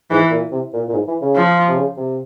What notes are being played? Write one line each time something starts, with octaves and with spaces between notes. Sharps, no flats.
G#2 E3
A#2
C3
A#2
A#2
G#2
E3
C#3
F3
C3
C#3
C3